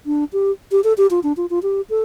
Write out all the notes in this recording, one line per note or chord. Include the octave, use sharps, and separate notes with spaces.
D4
G4
G4
A4
G4
F4
D4
F4
F4
G4
A4